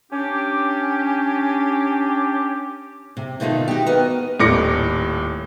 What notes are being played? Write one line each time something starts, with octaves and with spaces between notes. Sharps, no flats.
C#4 D4 G4
C3
B2 D3 D#3 A3 D#4 F4
D#4 F#4 G4
B3 F#4 A#4 D#5
D#1 A2 D6 A#6 C#7